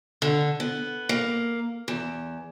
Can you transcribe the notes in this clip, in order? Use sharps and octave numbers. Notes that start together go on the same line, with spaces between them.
D3
B3
A#3
E2